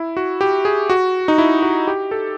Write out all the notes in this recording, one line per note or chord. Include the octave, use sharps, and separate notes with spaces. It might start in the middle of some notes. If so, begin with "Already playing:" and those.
Already playing: E4
F#4
G4
G#4
F#4
D#4
E4
F#4
G4
A4